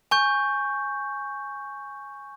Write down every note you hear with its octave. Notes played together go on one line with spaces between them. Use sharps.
G#5 C#6 G6